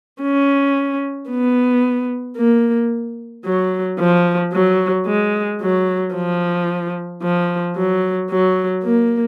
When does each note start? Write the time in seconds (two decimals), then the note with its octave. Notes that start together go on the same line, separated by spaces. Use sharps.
0.22 C#4
1.29 B3
2.37 A#3
3.45 F#3
4.00 F3
4.53 F#3
5.07 G#3
5.61 F#3
6.15 F3
7.23 F3
7.76 F#3
8.30 F#3
8.84 A#3